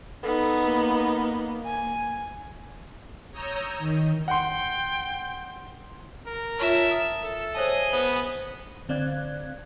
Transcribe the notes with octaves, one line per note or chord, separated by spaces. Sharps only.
B3 D#4 A4
A#3
G#5
C#5 A#5 D#6 E6 G6
D#3
F#5 G5 C6
A#4
F4 C#5 E5 A5 F6
D#6
A4 E7
G#4 C5 C#5 D#5 A5
B3 C5 D#6 D#7
D3 C4 D5 F5 F#6 G#6